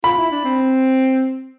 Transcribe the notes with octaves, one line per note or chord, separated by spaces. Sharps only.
F4 B5
E4
D4
C4